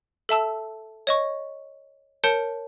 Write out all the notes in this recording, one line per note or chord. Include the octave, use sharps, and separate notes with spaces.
A4 E5 A5 E6
C#5 D#5 C#6
A#4 C#5 A5 G6 C#7 D7